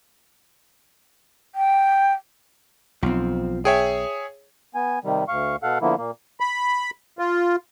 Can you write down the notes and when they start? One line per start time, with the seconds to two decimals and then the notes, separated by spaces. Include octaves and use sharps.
1.55 G5
3.03 B1 F3 C4
3.65 G#4 C#5 E5 G5
4.75 B3 G#5
5.04 C3 D#3 G3
5.28 D2 F5 C#6
5.63 B2 A4 F5 F#5
5.82 D3 F3 A#3 B3 E4
5.97 A#2 A#3
6.40 B5
7.19 F4